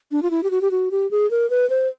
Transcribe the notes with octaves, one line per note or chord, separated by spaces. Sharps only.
D4
F4
E4
G4
F#4
G4
F#4
G4
G#4
A#4
B4
C5